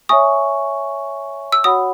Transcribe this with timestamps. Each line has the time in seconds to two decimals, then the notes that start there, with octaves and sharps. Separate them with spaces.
0.09 C#5 E5 G#5 C#6 D#6
1.52 E6
1.64 F#4 C#5 F#5 B5 D#6